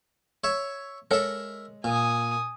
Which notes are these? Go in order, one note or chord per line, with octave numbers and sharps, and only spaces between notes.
C#5 E5
G#3 A4 A#4 C#5 E5
A#2 G#5 D#6